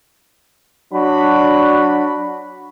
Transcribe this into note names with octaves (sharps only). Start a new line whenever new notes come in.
F#3 D4 F#4 B5